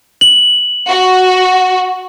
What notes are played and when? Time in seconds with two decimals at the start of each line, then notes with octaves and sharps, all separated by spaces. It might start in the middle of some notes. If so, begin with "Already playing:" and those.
0.21 F#7
0.88 F#4